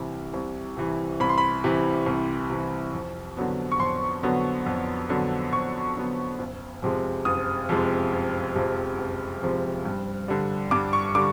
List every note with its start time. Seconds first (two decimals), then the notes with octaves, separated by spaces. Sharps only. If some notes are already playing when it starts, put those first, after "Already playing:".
Already playing: C2 C3 E3
0.34 C2
0.77 C3 E3
1.20 C2 B5
1.29 C6
1.38 B5
1.64 C3 E3
2.06 C2
2.50 C3 E3
2.93 F2
3.37 D3 F#3 B3
3.72 C#6
3.80 F2 C6
4.23 D3 F#3 B3
4.66 F2
5.10 D3 F#3 B3
5.53 F2 C#6
5.96 D3 F#3 B3
6.39 F#1
6.82 F2 C3 F3 G#3
7.25 F#1 D#6
7.69 F2 C3 F3 G#3
8.12 F#1
8.55 F2 C3 F3 G#3
8.99 F#1
9.42 F2 C3 F3 G#3
9.85 G2
10.28 D3 G3
10.71 G2 D6
10.93 C#6
11.15 D3 G3 D6